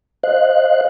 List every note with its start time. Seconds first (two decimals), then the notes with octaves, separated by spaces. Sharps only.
0.23 C5 D#5 F5 F#6